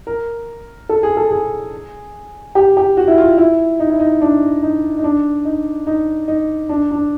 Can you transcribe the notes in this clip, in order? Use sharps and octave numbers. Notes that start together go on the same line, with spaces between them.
A#4
A4
G#4
A4
G#4
G4
G4
F#4
E4
F4
E4
D#4
E4
D#4
D4
D#4
D#4
D4
D#4
D#4
D#4
D4
D4